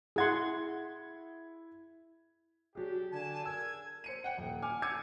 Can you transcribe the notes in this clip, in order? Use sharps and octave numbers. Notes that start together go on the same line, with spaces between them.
E4 G#4 F#5 C6 G#6
F#3 D4 G4 G#4
D3 D4 G#5 A5
A#4 E6 G#6
C5 C#7 D#7
F#5 G5
D#1
G#5 D6 F6
D6 E6 G#6 C#7 D#7